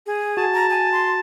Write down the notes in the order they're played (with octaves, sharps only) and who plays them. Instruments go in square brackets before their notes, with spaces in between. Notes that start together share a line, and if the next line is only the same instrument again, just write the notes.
[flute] G#4
[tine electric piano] F#4 [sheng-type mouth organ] A5
[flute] A#5
G#5
C6